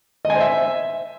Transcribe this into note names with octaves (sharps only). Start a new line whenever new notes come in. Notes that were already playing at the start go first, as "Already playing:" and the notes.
D#5
G#5
C5
E5